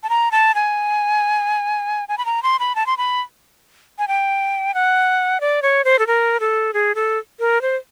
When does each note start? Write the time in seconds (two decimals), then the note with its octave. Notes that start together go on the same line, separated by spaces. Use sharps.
0.03 A5
0.10 A#5
0.32 A5
0.55 G#5
2.09 G#5
2.18 B5
2.25 A#5
2.43 C6
2.60 B5
2.75 A5
2.86 C6
2.98 B5
3.98 G#5
4.08 G5
4.74 F#5
5.41 D5
5.62 C#5
5.85 C5
5.99 A4
6.07 A#4
6.40 A4
6.74 G#4
6.95 A4
7.40 A#4
7.62 C5